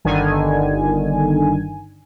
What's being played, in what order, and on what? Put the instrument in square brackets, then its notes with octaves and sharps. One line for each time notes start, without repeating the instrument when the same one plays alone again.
[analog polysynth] G1 D3 D#3 G#5